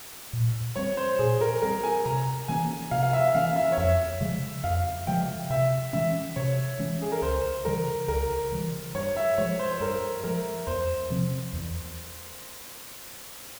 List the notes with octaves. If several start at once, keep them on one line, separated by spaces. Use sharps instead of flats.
A#2
G3 C4 C#5
C5
A#2 G#4
A#4
G3 C4 A#4
G#5
C3 A#5
E3 A#3 C#4 G#5
C3 F5
F5
E5
E3 A#3 C#4 F5
E5
C#5
F2 E5
C#3 F3 G#3
F2 F5
C#3 F3 G#3 G5
C3 E5
E3 G#3 C#4 E5
C3 C#5
E3 G#3 C#4
G#4
A#4
C#2 C5
C#3 E3 G3 A#4
C#2 A#4
C#3 E3 G3
G2 C#5
E5
F3 G#3 C#5
C5
C5
G2 A#4
F3 G#3 A#4
E2 C5
C3 F3 C4
E2